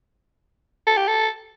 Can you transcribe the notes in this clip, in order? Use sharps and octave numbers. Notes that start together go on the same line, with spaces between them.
A4
G4
A4